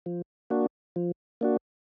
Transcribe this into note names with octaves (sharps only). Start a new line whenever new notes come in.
F3
A#3 D4 F#4
F3
A#3 D4 F#4